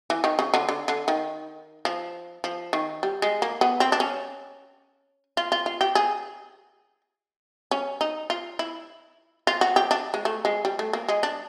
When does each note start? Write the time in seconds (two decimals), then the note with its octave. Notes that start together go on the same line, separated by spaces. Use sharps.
0.10 E3
0.24 D#3
0.39 C#3
0.54 D3
0.69 D3
0.88 D3
1.08 D#3
1.85 F3
2.44 F3
2.73 D#3
3.03 G3
3.22 G#3
3.42 A#3
3.61 B3
3.80 C4
3.92 D4
4.00 C#4
5.37 F4
5.52 F4
5.66 F4
5.81 G4
5.95 G#4
7.71 C#4
8.01 D#4
8.30 F4
8.59 E4
9.47 F4
9.61 F#4
9.76 G4
9.91 D4
10.14 G#3
10.25 A3
10.45 G#3
10.65 G3
10.79 A3
10.93 A#3
11.08 G#3
11.23 D4